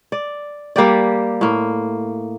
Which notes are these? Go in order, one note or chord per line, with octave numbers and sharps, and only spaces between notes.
D5
G3 A#3 G4 D5
A2 A#3